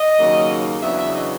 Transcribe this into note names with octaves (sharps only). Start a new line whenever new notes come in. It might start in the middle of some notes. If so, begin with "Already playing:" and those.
Already playing: D#5
D#2 C#3 F#3 A#3
E2 C#3 F#3 B3 D4 E5
E5
D#5